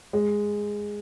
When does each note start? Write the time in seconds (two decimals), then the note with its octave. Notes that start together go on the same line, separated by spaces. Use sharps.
0.13 G#3